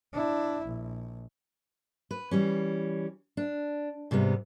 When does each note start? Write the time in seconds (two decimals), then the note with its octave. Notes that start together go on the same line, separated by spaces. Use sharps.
0.13 D4 E4
0.65 A#1
2.11 B4
2.31 E3 G3 C#4
3.37 D4
4.11 G#2 C3 G3 B3